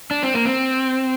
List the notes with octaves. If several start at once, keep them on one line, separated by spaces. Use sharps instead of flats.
D4
C4
A#3
C4